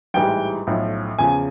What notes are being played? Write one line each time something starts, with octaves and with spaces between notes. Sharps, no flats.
A1 G#2 E3 G3 G5
B1 A2 F3
E2 C#3 F3 G#5